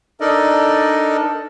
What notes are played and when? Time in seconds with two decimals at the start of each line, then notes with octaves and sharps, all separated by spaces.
0.20 D4 D#4 A4 A#4 D5 D#5